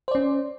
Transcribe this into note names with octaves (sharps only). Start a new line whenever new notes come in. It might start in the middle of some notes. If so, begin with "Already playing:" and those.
C#4 C5 D5